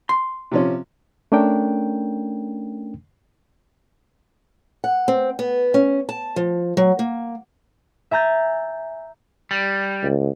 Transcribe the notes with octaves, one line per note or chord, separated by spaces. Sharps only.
C6
C3 F3 C#4
A3 C#4 D4 A#4 G5
F#5
C4
B3
C#4
A5
F3
F#3
A#3
E5 G#5 A#5 G6 A6
G3
C#2